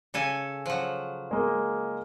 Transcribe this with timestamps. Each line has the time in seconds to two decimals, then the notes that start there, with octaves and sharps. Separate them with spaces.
0.14 C#3 A4 G#5
0.66 F3 F#3
1.31 G#3 A#3